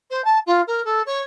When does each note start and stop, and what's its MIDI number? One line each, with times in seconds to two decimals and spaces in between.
0.10 0.24 72
0.24 0.39 81
0.46 0.61 65
0.67 0.84 70
0.85 1.02 69
1.06 1.22 73